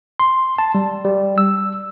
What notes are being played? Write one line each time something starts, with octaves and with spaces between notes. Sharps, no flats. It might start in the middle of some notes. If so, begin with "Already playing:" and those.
C6
A5
G3
G3
E6